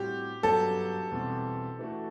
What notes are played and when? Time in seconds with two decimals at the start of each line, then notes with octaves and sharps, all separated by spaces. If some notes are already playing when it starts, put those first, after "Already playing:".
Already playing: A2 G3 C4 F#4 G4
0.43 G2 F#3 B3 F#4 A4
1.11 E2 B2 G3 C4
1.79 E3 A3 D4 F#4